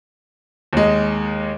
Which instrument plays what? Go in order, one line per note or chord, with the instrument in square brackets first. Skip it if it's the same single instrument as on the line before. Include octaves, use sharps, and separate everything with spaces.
[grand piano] D#2 G#3